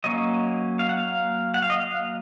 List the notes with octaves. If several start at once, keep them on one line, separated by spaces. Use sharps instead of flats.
F#3 A#3 C#4 D#5
F5
F#5
F5
F#5
F5
D#5
F5